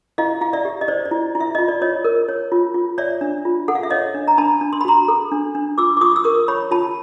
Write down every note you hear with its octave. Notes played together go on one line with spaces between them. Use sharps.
E4 D#5 F5
E4 F5
D5 E5
G4
D#5
C5 D5
D5
E4
E4
E5
F4 D#5
D5
F4 C#5 D#5
A#4
C#5
F4
F4
C#5 D5 E5
D4
F4
A4 F#5
F5
E5
C#5 D#5 F5
D4
A#5
D4 A5 B5
D4
C6
B5
F#4 A#5 C6
A4
D4
D4
F4 D6 E6
D6
F4 C#6 D#6
E6
A#4 C#6 D#6
C#5 B5 C#6
F4 A5 B5